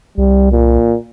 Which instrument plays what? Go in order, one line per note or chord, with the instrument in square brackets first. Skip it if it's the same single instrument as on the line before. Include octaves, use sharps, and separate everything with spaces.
[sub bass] C2 [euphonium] G3
[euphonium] A#2